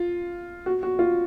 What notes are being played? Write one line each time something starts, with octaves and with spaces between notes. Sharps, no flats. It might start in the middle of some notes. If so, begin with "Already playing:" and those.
Already playing: F4
F#4
F#4
F4